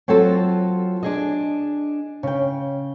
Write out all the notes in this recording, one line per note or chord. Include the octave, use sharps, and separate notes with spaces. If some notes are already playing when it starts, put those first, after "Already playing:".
F#3 C4 F4 F#4 A4
D4 G#4 D#5
C#3 G5